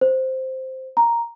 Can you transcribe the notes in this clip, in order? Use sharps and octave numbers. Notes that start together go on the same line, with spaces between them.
C5
A#5